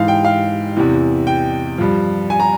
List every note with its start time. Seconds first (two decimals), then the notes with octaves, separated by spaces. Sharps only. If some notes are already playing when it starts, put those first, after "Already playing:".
Already playing: G#2 E3 F5
0.08 G5
0.25 F5
0.77 E2 C3 E3
1.27 G5
1.78 G2 F3
2.30 G#5
2.40 A#5